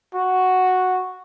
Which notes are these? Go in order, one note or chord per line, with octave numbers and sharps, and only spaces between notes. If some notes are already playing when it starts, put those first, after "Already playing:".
F#4